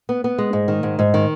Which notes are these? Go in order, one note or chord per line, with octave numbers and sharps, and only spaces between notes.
B3
B3
G#3
G#2
D#3
G#2
G#2
D#3